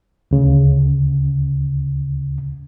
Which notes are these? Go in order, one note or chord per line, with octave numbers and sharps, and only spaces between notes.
D2 C#3